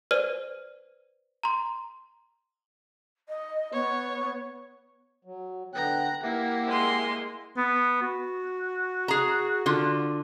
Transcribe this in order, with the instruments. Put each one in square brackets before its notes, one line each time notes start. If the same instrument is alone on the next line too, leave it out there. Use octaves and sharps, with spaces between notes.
[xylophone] B4 C5 D5 F6 D#7 G7
A#5 C6
[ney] D#5
[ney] B3 [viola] C#5
[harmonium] F#3
[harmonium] D3 B3 G5 [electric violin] A#5 F#6
[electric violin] A#3 E4 [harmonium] G4 E5 F#5
[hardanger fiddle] G#3 C6
[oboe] B3
F#4
[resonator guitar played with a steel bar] G#4 A#5
D3 F4